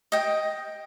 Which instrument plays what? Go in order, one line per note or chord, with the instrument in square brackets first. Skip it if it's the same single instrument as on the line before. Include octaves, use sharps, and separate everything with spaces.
[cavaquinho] D#5 G5